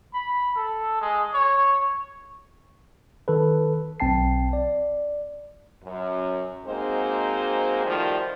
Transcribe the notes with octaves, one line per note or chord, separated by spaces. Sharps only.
B5
A4
G#3
C#5
D#3 A4 B4
B1 C4 G5 A5 C7
D5
F#2
G#3 A#3 C4 D#4 F#4 C5
D#3 F3 G3 A3 F#4 G4